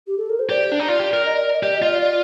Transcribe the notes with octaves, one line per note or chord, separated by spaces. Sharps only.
G4
A4
A#4
C5
G4 D5
D4
D#4
F4 D5
G4
A#4
D#5
D5
D5
D#5
G4 D5
D#5
F4
D5
D5